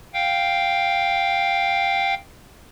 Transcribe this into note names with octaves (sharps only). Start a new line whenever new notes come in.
F5 G5